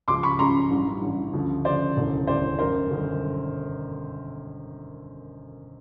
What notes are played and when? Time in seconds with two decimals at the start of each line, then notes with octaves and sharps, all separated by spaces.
0.08 C#2 C#3 F3 C6 D6
0.23 B5 C#6
0.39 C#2 C#3 F3 A#5 C6
0.70 A1 G2 E3
1.02 A1 G2 E3
1.33 D2 C#3 F3
1.65 D2 C#3 F3 C5 D5
1.97 E1 D2 C#3 E3
2.27 E1 D2 C#3 E3 C5 D5
2.59 G1 F#2 D#3 A#4 C5
2.91 G1 F#2 D#3